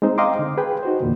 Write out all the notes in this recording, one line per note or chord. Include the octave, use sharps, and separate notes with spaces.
G#3 C4 D#4 C5
D#5 F5 G5 A#5 C6 D6
D3
G#4 B4 G5
D#4 F#4 C5
E2 A#2 D3